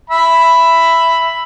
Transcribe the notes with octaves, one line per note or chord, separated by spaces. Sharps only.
E5 B5